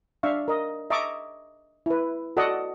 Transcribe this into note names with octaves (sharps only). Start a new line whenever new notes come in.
D4 E5 F5 C#6
A#4 D#5
D#5 E5 A5 A#5 C#6 D6
E4 B4
F#4 A4 D5 D#5 F#5